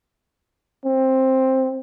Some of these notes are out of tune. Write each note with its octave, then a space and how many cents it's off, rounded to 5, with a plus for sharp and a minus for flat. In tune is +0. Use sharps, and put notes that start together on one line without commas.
C4 +10